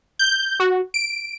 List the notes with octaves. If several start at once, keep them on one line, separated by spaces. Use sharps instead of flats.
G6
F#4
D7